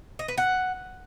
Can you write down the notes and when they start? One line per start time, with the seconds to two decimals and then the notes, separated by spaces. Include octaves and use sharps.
0.19 D#5
0.28 B4
0.38 F#5